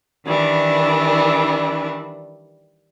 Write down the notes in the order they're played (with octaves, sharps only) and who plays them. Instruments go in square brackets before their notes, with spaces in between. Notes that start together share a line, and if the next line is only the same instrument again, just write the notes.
[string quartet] D#3 E3 G3 D4